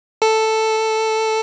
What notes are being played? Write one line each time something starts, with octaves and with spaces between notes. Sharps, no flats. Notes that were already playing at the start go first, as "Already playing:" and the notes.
A4